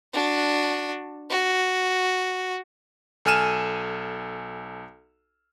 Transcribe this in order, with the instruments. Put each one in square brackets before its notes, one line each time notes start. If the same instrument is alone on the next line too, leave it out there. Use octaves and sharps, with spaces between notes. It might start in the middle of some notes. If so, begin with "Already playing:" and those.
[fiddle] D4 F#4
F#4
[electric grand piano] B1 A4 G#5 F6 D#7 E7